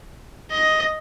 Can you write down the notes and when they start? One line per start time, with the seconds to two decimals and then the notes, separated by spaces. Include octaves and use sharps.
0.51 D#5